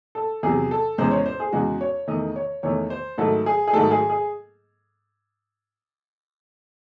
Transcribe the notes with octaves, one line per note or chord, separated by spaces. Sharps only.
A4
E2 C3 F#3 G#4
A4
E2 C#3 G#3 C5
C#5
C5
G#4
E2 C#3 G#3 F#4
C#5
E2 D#3 A3 D#5
C#5
E2 D#3 A3 C#5
C5
G#2 D#3 F#3 A3 A4
G#4
G#4
G#2 D#3 F#3 A3 A4
G#4
G#4